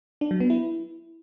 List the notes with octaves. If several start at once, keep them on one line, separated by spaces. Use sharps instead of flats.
D4
F#3
B3
E4